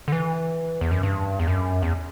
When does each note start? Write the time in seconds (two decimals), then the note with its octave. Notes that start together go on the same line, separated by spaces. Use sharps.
0.08 D3
0.12 E3
0.81 E2
0.91 F#2
1.03 G2
1.39 E2
1.48 F#2
1.82 E2